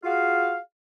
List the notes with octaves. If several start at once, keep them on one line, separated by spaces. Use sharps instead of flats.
F4 F#4 G#4 F5